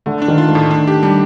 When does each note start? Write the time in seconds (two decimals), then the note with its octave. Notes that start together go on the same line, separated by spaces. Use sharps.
0.06 D3 A3
0.22 D4
0.28 D#3
0.38 F4
0.49 A3
0.55 A2
0.71 D4
0.87 G4
1.03 G3 D4